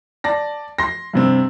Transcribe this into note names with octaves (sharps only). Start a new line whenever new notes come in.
D5 A5 A#6
C6 A#6
G2 C3 C4